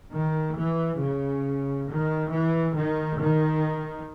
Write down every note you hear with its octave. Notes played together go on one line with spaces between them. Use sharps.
D#3
E3
C#3
D#3
E3
D#3
D#3